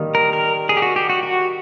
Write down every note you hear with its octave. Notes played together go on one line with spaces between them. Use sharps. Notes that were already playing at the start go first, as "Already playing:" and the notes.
Already playing: D#3 G3 A#3 D#4
A#4
A#4
G#4
G4
F#4
G4
F#4
F#4